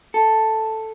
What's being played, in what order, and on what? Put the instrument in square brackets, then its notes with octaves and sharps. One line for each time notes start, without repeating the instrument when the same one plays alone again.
[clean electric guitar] A4